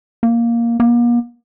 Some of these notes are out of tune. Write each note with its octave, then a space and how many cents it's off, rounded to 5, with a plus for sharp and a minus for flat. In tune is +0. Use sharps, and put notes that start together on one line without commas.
A#3 +5
A#3 +40